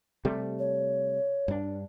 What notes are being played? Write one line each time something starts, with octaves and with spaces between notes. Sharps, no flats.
C3 G3 A3
C#5
G2 D4